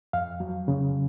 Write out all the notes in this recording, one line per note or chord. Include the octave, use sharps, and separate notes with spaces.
F2 F5
F#3
C#3